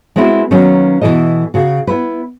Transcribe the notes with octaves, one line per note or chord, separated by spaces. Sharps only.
G#3 B3 C4 D#4 E4 F#4
D#3 F#3 A#3 B3 C#4 D#4
B2 E3 E4 A4 D#5
C#3 F#4
B3 E4 B4